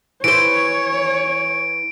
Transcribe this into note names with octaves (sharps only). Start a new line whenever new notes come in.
E3 C5 C#5 D7